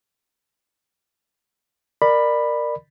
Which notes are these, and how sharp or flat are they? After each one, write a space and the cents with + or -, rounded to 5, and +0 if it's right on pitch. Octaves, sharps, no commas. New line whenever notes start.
A#4 +0 D5 +25 B5 +0